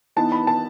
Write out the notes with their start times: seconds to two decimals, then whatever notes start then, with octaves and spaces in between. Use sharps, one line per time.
0.16 E3 B3 D#4 A5
0.32 B5
0.47 A5